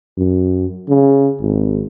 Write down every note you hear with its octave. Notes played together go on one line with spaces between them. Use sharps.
F#2
C#3
G#1